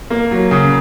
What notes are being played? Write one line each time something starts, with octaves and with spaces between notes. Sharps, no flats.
A#3
F#3
C#3